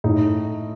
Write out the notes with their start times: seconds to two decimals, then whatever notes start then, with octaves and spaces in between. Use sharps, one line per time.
0.04 A2 D#4